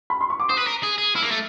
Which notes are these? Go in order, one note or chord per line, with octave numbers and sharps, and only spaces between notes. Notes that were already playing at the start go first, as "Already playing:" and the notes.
B5
C6
C#6
D6
C5 D#6
B4
A#4
G#4
G#4
E4 F6
A#3
A3